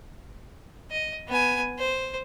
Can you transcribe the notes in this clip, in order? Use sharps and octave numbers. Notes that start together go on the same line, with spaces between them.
D#5
B3 G#5
C5